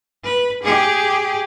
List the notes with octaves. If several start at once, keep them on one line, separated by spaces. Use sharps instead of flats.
B4
G4 G#4